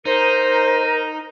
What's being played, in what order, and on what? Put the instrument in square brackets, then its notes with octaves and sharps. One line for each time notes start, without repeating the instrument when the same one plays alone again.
[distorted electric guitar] D#4 [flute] A#4 [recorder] C5